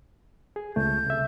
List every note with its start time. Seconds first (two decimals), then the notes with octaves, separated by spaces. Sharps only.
0.56 G#4
0.76 C#2 A3 G6
1.06 C2 E5